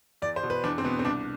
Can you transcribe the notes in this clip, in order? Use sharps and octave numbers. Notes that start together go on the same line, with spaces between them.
E2 D5
C5
B2
B4
E2 D4
C4
B2 B3
C4
C2 D4